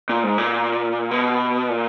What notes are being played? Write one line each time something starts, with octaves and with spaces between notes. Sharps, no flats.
A#2
G#2
A#2
B2
A#2